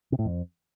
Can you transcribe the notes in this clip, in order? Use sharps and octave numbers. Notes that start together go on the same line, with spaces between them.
C3
A2
F2